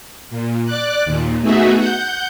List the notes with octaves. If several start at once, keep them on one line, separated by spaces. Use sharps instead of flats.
A#2
D5 D6 F#6
D#2 A#2
A3 B3 D#4 F#4 G#4 E5
F#5 G6